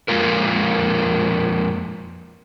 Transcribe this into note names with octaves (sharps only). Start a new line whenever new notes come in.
F2 G#3 A#3 F4 A#4